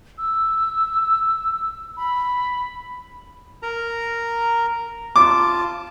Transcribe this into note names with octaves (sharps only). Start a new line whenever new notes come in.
E6
B5
A#4 A#5
F4 A5 D6